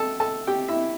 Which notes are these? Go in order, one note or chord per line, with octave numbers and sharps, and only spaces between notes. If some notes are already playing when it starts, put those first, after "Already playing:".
Already playing: A4 A5
A4 A5
G4 G5
E4 E5